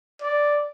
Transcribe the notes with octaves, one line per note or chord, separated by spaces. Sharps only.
D5